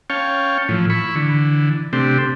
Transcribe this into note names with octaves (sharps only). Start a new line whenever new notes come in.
C#4 C#5 F5 G5 A5
A2 E3 F3
E4 B5 C#6
D3 E3
C3 A3 C4 D4 G4